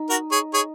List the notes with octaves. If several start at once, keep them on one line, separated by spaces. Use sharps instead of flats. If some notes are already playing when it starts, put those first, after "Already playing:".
Already playing: D#4
F#4 A#4
G#4 C#5
G#4 C#5